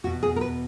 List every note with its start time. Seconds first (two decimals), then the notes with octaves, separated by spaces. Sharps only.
0.04 E2 F#4
0.07 B2
0.23 G#4
0.36 A#4
0.41 B4